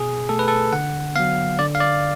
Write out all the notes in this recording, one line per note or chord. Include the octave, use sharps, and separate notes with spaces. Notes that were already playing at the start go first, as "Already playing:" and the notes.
Already playing: B2 G#4
A3 A4
B4
A4
D3 F#5
F#3 B3 F5
D3 D5
F5
D5